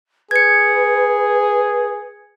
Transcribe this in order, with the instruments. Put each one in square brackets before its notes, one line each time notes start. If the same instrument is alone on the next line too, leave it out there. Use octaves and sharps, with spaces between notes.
[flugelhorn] G#4 [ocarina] B4 [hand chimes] G#6 C#7